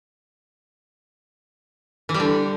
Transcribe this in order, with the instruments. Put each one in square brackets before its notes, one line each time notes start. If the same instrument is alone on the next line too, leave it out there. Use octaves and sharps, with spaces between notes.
[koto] E3
G3
D3